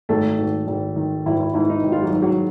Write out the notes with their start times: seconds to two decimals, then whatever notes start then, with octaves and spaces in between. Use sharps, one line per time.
0.09 G#1 A3 A4
0.38 G#1
0.67 G#1
0.96 D#3
1.26 G#1 E4
1.40 E4
1.54 G#2 E4
1.70 D#4
1.83 G#1
1.92 F4
2.03 F#3 F#4
2.13 G#2
2.22 F#3 F#4